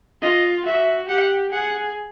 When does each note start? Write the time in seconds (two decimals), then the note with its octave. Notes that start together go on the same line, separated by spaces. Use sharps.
0.22 F4 D#5
0.65 F#4 E5
1.08 G4 F#5
1.52 G#4 F#5